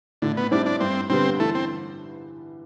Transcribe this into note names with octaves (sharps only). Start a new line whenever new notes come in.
A2 D3
B3
G3 C4 D4 E4 G4
D4
G2 C4
D3 G3 B3 C4
E3 A3
C4